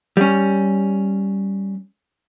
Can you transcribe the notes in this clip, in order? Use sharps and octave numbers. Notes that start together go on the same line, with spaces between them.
G3 C#4